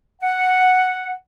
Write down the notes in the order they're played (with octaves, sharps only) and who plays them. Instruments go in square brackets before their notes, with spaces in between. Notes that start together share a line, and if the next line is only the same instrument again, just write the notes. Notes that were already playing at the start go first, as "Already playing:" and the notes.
[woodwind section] F#5